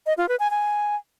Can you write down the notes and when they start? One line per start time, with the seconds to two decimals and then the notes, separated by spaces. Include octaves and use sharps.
0.06 D#5
0.17 F4
0.29 B4
0.40 G#5
0.51 G#5